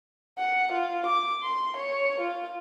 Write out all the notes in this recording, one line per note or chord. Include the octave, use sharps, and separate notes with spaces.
F#5
F4
D6
C6
C#5
F4